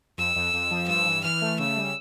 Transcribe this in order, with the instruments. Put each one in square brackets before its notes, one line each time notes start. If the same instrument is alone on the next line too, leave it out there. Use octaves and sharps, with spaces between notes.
[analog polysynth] F2 [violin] E6
[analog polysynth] F2
F2
F3
[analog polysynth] G2 [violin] E6
[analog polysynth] E3
[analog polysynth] E3 [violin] F6
[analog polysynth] A3
[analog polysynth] C#3 [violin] E6
[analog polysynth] G3